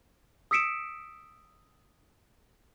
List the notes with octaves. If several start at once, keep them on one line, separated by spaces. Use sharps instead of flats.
D#6 E6 B6 C#7 D7 E7